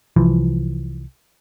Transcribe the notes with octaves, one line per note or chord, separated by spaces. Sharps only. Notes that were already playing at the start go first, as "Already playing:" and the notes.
C2 E3 F3